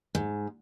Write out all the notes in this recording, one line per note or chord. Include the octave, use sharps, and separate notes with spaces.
G#2